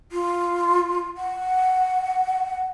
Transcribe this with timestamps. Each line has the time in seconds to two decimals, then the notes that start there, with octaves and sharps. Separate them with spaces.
0.12 F4
1.17 F#5